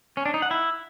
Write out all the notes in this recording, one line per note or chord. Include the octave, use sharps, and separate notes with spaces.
C#4
D4
D#4
F#5
E4